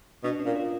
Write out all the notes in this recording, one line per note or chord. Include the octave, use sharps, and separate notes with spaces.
B2 D4
C#4
A#2
F4